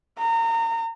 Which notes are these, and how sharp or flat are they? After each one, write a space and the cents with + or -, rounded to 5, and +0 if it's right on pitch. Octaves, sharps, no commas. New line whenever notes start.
A#5 -30